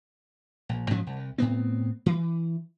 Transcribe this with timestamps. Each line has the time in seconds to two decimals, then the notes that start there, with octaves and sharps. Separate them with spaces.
0.69 A#1
0.90 G#2 F3 F#3 C#4
1.07 C2
1.38 A2 B3 C4
2.06 E3